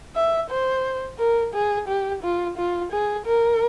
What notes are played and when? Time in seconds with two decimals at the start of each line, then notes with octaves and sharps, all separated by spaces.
0.16 E5
0.50 C5
1.19 A#4
1.54 G#4
1.88 G4
2.23 F4
2.57 F4
2.92 G#4
3.25 A#4